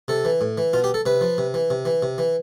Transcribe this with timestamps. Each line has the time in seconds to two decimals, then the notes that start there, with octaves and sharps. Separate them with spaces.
0.08 C3 A4
0.25 E3
0.41 A2
0.58 E3
0.73 B2 F4
0.84 G4
0.94 A4
1.06 C3 B4
1.21 F3
1.38 C3
1.54 E3
1.70 C3
1.85 E3
2.03 C3
2.18 E3